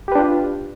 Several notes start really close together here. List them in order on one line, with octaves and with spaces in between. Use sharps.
G4 B4 D4 F4